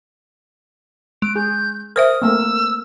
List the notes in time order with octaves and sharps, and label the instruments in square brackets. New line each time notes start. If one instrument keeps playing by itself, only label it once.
[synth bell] G#3 [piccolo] D7
[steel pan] G#4 [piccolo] G6
[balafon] A#4 C5 E5 [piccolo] D#6 [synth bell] F6
[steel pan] A3 A#3 C4 [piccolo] E6